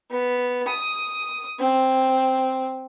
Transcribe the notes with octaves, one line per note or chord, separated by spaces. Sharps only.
B3
D#6
C4